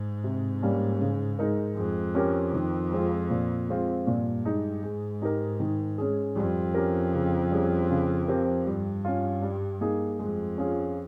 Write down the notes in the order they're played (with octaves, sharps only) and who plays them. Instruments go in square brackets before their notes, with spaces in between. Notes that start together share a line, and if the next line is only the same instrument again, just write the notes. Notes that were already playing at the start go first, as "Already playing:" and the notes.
Already playing: [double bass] G#2
[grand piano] C3
G3 A#3 C#4
C#3
G#3 D#4 A#4
[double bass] F2 [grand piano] G#3
[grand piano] C#4 G4 A#4
D#3
G#3 C4 F4
A#2
G#3 C4 F4
[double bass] G2 [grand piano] A#2
[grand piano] G#3 D#4
[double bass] G#2 [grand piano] G#3
[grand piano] D#4 G4 A#4
D#3
G#3 C#4 G#4
[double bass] F2 [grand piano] G3
[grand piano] C#4 G4 A#4
C#3
G3 C#4 G#4
C#3
F3 C4 G4 A#4
[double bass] G2 [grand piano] G3
[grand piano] C#4 F4
G3
A#3 D#4 G#4
[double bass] F2 [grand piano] G#3
[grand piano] C#4 F4 G#4